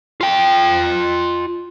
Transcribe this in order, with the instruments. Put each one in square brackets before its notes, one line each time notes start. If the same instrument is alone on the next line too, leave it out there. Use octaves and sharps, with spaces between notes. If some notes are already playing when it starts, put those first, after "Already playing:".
[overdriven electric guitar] F4 G5